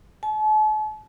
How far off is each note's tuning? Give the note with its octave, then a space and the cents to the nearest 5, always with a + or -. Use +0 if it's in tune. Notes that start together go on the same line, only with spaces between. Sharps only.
A5 -45